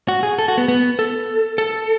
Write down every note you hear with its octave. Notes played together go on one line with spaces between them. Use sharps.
F#4
G#4
A4
F#4
B3
B3
A4
A4